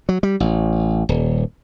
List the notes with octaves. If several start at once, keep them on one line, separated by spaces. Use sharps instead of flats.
F#3
G3
A1
D#1